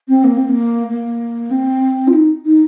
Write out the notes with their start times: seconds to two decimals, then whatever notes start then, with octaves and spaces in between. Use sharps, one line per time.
0.08 C4
0.24 A#3
0.37 C4
0.49 A#3
0.88 A#3
1.51 C4
2.08 F4
2.13 D#4
2.45 D#4